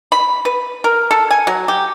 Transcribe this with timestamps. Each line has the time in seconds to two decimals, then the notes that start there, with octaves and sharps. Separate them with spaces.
0.12 B5
0.45 B4
0.84 A#4
1.11 A4
1.31 G#5
1.47 F#3
1.68 G4